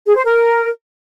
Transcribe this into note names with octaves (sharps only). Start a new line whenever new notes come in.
G#4
C5
A#4